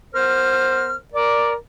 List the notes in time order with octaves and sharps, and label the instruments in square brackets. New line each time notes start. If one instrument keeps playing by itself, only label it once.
[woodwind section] B3 A#4 F6 [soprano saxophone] C5
[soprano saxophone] A#4 [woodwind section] D5